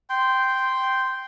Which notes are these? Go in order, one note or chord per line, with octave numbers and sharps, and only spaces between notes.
G5 C6